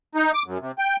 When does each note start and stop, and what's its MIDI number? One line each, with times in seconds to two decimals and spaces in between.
0.15 0.32 63
0.34 0.42 86
0.46 0.58 42
0.61 0.72 48
0.78 0.96 79